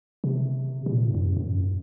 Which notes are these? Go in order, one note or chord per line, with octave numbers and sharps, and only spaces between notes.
C3
C3
A#2
G#2
F#2
F#2